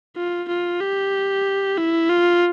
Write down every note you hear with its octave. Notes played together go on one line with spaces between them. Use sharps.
F4
F4
G4
E4
F4